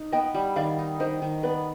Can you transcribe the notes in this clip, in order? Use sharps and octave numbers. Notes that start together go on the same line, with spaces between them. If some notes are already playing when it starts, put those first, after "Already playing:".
Already playing: D#4
B3 D#5 G5
G3
D#3 D5 F5
D#4
D#3 C5 D#5
D#3
B3 B4 D5